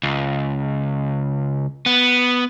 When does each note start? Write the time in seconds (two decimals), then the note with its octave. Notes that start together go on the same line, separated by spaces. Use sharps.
0.03 C#2
1.86 B3